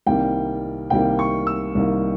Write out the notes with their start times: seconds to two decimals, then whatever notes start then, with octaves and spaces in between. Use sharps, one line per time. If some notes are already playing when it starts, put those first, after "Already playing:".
0.06 C2 C3 D#3 G3 A#3 G5
0.90 C2 C3 D#3 G3 A#3 G5
1.19 C#6
1.47 E6
1.75 C2 C3 D#3 G3 A#3